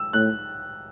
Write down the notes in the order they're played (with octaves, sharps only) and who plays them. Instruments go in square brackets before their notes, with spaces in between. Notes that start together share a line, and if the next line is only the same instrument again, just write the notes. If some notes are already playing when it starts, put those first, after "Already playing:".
Already playing: [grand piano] E6
[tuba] A2 [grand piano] F#6